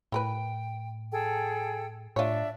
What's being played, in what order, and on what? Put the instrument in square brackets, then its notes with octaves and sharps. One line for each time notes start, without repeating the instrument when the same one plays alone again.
[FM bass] A2 [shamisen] E4 A#4 B4 [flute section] G5
[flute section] G#4 A4 G5
[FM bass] A2 [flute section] D4 E5 [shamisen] F4 C#5